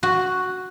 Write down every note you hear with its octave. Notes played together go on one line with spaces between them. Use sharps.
F#4